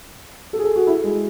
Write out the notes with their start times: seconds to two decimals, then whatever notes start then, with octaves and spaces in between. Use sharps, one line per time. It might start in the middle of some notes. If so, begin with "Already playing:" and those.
0.53 A4
0.59 G#4
0.64 A4
0.76 F#4
0.87 E4
1.04 G#3